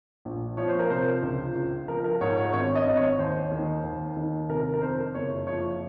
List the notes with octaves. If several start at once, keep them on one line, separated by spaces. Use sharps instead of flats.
A#1
F3 C#5
C5
A#4
C3 C5
C#2
C#2
F3 A#4
A#4
G#2 C#5
C#5
G#1 C#5
D#5
G#1
C#5
D#2 C5
D#3
D#2
D#3
C3 A#4
A#4
F2 C5
F#1 C#5
F3 C#5